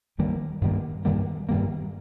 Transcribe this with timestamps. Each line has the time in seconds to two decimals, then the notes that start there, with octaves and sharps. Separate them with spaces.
0.18 G2 D#3 G3 A#3
0.61 G2 D#3 G3 A#3
1.05 G2 D#3 G3 A#3
1.49 G2 D#3 G3 A#3